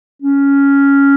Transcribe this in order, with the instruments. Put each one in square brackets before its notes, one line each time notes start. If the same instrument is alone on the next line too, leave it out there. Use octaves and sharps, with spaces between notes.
[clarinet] C#4